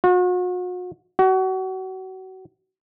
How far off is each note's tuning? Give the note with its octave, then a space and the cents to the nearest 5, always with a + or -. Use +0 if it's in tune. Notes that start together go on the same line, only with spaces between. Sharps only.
F#4 -40
F#4 +30